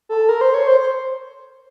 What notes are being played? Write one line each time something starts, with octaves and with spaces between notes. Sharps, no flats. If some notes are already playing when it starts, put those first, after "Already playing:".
A4
A#4
C5
C#5
C5
C5